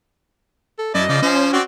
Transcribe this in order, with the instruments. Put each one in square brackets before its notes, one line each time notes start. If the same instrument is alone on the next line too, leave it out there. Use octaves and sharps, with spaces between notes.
[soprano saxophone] A4
[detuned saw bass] F#2 [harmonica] E4 D5 A5 [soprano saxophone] D#5
[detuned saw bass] C#3 [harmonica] F3 D5
[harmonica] F3 C5 [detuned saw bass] C#4
[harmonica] C4 D5 G5 [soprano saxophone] F#4